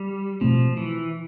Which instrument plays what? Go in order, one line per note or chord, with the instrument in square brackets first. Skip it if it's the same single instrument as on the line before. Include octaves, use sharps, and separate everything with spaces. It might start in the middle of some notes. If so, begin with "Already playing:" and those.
Already playing: [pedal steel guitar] G3
[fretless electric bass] B2 A3 C4 [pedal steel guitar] F3
[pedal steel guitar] E3